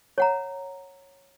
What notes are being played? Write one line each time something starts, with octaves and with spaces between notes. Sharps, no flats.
C#5 F#5 A#5